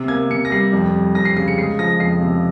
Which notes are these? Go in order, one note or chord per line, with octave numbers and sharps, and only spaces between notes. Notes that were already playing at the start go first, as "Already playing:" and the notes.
Already playing: C3
A#3 G#6
C3 C#7
A#6
G3 C7
F2
G3
F2 A#6
C7
C#3 C7
C#7
G#3 C7
F3 A#6
F2 C7
C3